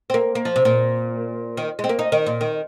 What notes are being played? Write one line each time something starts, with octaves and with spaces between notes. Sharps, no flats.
C4
A#3
A#3
F3
C3
A#2
D#3
G#3
C4
A#3
D#4
D#3
A#2
D#3